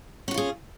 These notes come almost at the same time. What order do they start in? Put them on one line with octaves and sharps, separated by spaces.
C#4 F#4 F4 G#4